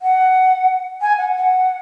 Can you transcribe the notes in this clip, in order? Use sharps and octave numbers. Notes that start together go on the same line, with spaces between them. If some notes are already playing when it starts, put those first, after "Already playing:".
F#5
G#5
F#5
F#5